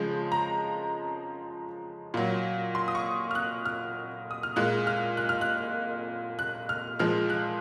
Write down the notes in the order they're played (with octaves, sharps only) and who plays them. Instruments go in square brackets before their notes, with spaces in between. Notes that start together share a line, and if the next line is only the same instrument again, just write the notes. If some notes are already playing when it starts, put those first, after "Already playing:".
Already playing: [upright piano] C#3 F3 G#3
A#5
A#2 F#3
C6
D#6
C#6
F6
F#6
F6
D#6
F6
A#2 G#3 F#6
F6
F#6
F6
F#6
F#6
F6
A#2 F3 G#3 F6
F#6